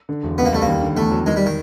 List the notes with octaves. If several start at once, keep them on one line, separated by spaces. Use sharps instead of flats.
D3
E1
C#2 B3
A#3
G3 A3
A#3
D#2
D3
E2 A3
F#3
D#3 G#3
G3
D#3